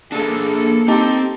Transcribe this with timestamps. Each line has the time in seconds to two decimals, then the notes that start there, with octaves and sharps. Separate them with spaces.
0.12 A#3 D4 G#4 A4
0.88 C4 D#4 G4 G5 A5